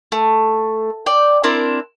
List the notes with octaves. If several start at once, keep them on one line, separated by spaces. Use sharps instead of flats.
A3
D5 G5
C4 D4 E4 A#4